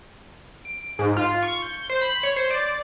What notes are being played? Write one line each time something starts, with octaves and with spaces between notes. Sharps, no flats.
D7
D7
G#2
F4
C#6
G6
C5
B5
C#5
C5
D5